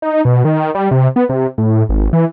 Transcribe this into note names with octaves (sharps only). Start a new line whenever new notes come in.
D#4
B2
D#3
G3
C3
B3
C3
A2
G#1
E3